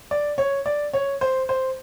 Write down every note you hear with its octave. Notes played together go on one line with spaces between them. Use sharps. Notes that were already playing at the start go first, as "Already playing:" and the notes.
D5
C#5
D5
C#5
C5
C5